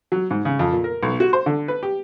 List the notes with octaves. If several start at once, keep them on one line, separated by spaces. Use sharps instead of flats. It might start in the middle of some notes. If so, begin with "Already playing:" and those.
F#3
G#2
C#3
F2
A#2
A#4
B1
F#4
C5
D3
B4
G4